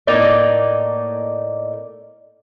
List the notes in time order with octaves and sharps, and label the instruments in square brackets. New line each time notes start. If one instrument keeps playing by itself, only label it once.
[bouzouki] A2 A#3 D#4 D5